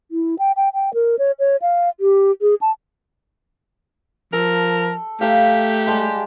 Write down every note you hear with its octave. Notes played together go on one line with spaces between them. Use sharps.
E4
G5
G5
G5
A#4
C#5
C#5
F5
G4
G#4
A5
F3 A4 A#4
A3 G4 F5 A#5
G3 G#3 A5